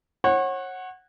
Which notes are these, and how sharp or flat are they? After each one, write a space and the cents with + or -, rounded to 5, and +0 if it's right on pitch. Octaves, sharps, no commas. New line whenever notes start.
C#5 -35 F#5 +0